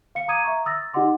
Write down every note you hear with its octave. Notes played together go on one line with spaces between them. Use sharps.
F5 C#7
A#5 D6 D#6 G#6 D#7
E5 A#5 C#6
D#6 E6 A6 A#6
D#4 G4 D#5 F#5 C6 D6